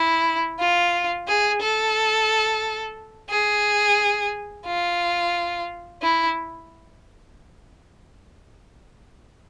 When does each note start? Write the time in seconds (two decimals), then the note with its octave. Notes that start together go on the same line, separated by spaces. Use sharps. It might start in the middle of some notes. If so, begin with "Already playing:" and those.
Already playing: E4
0.59 F4
1.28 G#4
1.62 A4
3.30 G#4
4.66 F4
6.02 E4